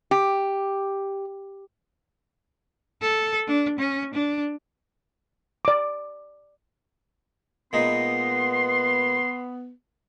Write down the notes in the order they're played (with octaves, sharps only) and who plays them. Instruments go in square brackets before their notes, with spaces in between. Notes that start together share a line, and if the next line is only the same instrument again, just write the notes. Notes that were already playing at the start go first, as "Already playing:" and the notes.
[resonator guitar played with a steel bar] G4
[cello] A4
D4
C#4
D4
[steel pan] D5 D6
[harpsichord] A#2 G#3 D#4 [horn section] B3 [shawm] C6